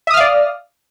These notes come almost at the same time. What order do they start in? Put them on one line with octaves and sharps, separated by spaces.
E5 D#6 F6 F5 D5